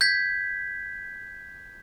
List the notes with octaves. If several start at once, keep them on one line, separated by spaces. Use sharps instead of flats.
G6 G#6 B6